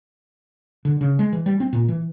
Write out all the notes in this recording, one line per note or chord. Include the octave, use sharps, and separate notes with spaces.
D3
C#3
G#3
E3
G3
C4
A#2
E3